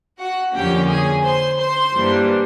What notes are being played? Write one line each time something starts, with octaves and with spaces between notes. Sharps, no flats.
F#4 F#5
F2 D3 F3 A#3 C#4 G4 G5
G#4 G#5
C5 C6
C5 C6
G2 E3 G3 A#3 D4